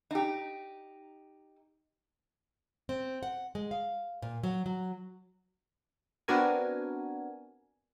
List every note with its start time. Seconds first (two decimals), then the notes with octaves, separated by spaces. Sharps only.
0.11 D#4 G4
2.89 C4
3.23 F#5
3.55 G#3
3.71 F5
4.22 A#2
4.43 F#3
4.66 F#3
6.28 B3 C4 D4 F#4 A#4 G#5